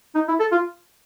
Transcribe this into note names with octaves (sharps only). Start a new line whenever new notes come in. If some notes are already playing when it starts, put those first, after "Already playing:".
D#4
E4
A4
F4